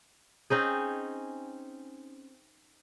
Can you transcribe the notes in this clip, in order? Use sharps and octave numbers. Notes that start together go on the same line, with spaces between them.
C4 C#4 D#4 G#4